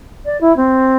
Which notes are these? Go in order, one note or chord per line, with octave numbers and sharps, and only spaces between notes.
D5
E4
C4